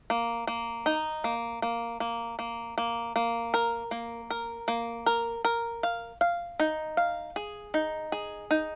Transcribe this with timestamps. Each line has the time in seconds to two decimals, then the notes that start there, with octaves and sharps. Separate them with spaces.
0.10 A#3
0.47 A#3
0.86 D#4
1.24 A#3
1.62 A#3
2.00 A#3
2.39 A#3
2.78 A#3
3.16 A#3
3.54 A#4
3.91 A#3
4.30 A#4
4.68 A#3
5.06 A#4
5.45 A#4
5.83 F5
6.21 F5
6.60 D#4
6.97 F5
7.36 G#4
7.74 D#4
8.12 G#4
8.51 D#4